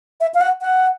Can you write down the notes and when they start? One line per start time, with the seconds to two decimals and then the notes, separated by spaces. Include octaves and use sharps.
0.21 E5
0.34 F5
0.41 F#5
0.61 F#5